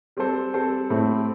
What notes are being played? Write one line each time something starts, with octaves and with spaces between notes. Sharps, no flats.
G3 C4 A4 C5
G3 C4 A4 C5
A2 A3 C4